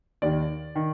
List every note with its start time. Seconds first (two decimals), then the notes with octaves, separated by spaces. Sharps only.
0.22 D#2 D#3 D5
0.75 D#3